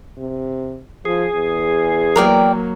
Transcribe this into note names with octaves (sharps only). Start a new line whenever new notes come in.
C3
F3 G#4
E2
F#3 A#3 A#4 D5 G5